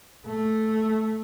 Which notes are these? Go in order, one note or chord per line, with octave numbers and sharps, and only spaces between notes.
A3